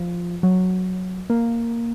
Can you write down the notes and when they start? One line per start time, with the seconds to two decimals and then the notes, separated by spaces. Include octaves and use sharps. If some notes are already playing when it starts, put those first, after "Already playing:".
Already playing: F3
0.43 F#3
1.30 A#3